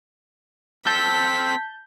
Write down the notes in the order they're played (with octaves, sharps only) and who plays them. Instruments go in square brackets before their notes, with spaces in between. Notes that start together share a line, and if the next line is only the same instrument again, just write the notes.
[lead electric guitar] C4 A4 [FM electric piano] A5 G6 [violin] B6